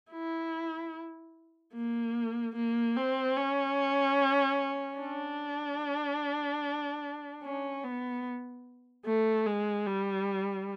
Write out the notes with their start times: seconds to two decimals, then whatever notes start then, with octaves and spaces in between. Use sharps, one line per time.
0.12 E4
1.74 A#3
2.56 A#3
2.96 C4
3.37 C#4
4.99 D4
7.43 C#4
7.84 B3
9.06 A3
9.47 G#3
9.87 G3